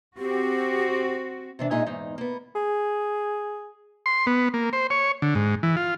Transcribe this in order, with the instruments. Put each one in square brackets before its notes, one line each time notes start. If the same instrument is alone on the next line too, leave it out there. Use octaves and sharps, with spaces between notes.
[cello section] C4 F#4 [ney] G4
[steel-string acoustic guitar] C3 E3 D4
A#2 G#3 D#4 D#5 E5 G#5
E2 G#2 D#4
A#3 B3
[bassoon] G#4
[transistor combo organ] C6
B3
A#3
C5
C#5
D3
G#2
E3
F4